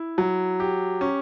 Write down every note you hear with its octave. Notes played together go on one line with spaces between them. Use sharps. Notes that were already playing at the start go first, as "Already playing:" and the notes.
Already playing: E4
F#3
G4
C#4